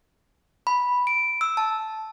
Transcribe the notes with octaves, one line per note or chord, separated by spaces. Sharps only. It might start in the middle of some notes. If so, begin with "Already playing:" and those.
B5
D7
E6
A5